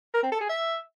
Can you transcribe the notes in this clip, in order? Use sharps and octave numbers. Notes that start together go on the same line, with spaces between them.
A#4
C4
A4
G#4
E5